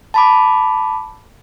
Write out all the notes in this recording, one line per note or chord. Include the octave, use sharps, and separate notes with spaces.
A5 B5 D6